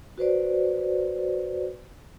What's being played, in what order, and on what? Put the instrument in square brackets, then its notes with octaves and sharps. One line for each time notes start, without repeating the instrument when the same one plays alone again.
[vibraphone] F#4 B4 C5 D5